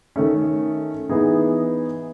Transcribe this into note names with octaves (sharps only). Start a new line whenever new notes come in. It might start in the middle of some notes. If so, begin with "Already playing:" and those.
D#3 A3 C#4
E3 B3 D#4 G#4